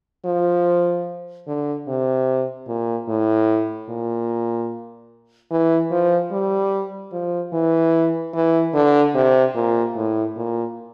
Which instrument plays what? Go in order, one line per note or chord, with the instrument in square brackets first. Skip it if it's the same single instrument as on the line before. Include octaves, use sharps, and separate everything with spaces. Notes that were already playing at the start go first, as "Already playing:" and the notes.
[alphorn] F3
D3
C3
A#2
A2
A#2
E3
F3
G3
F3
E3
E3
D3
C3
A#2
A2
A#2